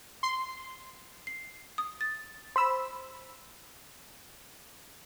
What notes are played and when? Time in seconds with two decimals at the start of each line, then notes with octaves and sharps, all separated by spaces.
0.23 C6
1.27 C7
1.78 D#6
2.01 A6
2.56 C5 B5 E6